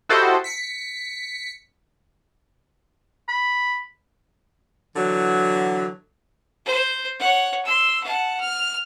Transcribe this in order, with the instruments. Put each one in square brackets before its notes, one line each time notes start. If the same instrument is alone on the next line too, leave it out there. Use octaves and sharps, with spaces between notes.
[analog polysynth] E4 F#4 G4 A4 C5 D#5
B6 C#7
[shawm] B5
[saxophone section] D3 E3 F#3
[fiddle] C5
C#5 F#5
C6 E6
F#5 A5
F6